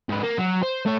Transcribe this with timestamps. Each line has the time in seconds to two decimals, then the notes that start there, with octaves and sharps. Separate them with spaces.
0.09 G#2 B4
0.23 A#3
0.38 F#3
0.63 C5
0.85 A3 C#5